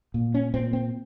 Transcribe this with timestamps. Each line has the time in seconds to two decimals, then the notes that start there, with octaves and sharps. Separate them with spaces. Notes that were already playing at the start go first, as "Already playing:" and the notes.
0.14 A#2
0.34 C#4
0.54 A#2 C4
0.73 C4